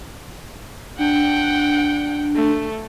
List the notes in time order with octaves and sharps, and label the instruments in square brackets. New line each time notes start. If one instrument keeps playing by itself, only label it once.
[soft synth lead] D4 [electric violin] F#5 G5
[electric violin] A3